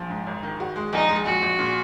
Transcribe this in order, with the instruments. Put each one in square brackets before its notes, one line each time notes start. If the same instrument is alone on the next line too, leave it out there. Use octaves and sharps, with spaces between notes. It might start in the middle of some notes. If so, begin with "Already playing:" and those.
Already playing: [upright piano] A#1 F3
G#2
G#1
D#3
F#4
G#3
[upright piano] A#1 [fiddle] D#4
[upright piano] G#3
[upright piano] A#1 [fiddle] F#4
[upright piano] A#1
A#2